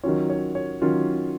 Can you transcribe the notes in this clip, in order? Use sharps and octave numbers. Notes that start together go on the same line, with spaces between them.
D#3 F#3 C#4 F4 C#5
C#5
C#5
D#3 F#3 C#4 F4